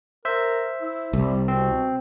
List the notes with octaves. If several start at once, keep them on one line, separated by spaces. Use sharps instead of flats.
A#4 C5 E5
E4
C2 G3
B2 C4